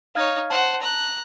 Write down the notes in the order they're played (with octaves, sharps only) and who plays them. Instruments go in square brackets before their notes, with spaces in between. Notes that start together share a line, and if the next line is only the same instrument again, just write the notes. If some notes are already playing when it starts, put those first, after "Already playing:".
[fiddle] D#4 C#5 [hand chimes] F5 F6 G#6
[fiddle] C5 F#5 [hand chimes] A5
[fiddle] A#5 F#6